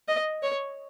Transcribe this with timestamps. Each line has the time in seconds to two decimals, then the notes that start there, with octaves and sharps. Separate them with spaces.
0.08 D#5
0.43 C#5